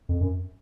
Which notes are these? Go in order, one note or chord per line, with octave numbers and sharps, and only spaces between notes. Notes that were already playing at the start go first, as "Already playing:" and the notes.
F2
F#2